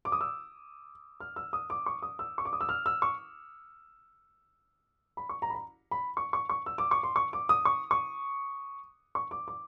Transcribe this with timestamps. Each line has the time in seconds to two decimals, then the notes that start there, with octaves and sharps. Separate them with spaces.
0.05 D6
0.12 D#6
0.21 E6
1.20 F6
1.36 E6
1.53 D#6
1.70 D6
1.86 C#6
2.02 D#6
2.19 E6
2.38 C#6
2.45 D6
2.53 D#6
2.61 E6
2.69 F6
2.86 E6
3.02 C#6
5.17 B5
5.29 C#6
5.42 A#5
5.50 B5
5.55 A#5
5.91 B5
6.17 C#6
6.33 C#6
6.50 C#6
6.66 E6
6.78 D6
6.91 C#6
7.03 C6
7.16 C#6
7.33 D6
7.49 D#6
7.65 C#6
7.91 C#6
9.15 C#6
9.31 D6
9.48 D6